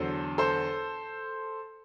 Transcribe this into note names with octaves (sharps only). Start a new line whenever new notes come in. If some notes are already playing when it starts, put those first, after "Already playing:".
Already playing: E2 D3 F#3 A4 C5
A4 C5